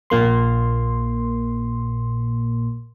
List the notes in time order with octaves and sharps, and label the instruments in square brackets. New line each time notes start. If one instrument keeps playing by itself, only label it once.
[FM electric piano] A#1 A#2 A#3 C6